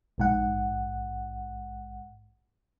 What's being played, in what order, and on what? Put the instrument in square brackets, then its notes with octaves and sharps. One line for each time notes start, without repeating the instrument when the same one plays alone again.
[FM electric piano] A#1 G#2 F#5